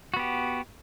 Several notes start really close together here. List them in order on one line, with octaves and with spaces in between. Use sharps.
F#4 B3 G4